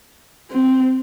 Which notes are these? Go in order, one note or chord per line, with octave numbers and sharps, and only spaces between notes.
C4